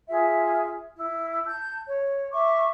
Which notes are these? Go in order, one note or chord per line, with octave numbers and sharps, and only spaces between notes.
F4 G#4 E5
E4
A5 G6
C#5
E5 C#6 D6